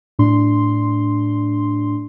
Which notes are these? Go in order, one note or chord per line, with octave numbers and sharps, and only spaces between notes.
A2 D4 C6